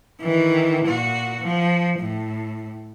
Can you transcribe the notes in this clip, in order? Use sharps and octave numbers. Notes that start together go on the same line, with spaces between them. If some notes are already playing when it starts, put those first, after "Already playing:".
D#3 E3
A#2 F#4
F3
A2